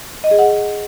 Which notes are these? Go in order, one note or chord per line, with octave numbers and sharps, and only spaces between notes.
D#5
G#4
F#5